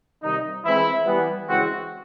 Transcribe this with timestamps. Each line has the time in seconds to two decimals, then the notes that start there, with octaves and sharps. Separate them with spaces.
0.23 C3 D#3 G3 D#4
0.65 E3 G#3 C4 E4
1.06 E3 G3 B3
1.47 C#3 E3 G#3 C4 F#4